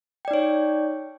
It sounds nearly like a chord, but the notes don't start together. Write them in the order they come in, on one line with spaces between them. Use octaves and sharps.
G5 D5 D#4 C#5